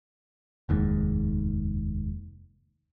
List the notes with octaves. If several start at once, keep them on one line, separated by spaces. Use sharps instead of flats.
F1 D#2 G#2